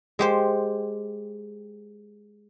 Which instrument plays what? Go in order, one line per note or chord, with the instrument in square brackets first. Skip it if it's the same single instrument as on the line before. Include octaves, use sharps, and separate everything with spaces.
[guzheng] G#3 G4 C5